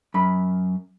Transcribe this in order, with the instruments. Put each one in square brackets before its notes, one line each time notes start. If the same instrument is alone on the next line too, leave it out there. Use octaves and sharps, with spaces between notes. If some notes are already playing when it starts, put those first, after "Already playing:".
[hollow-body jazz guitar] F#2 B5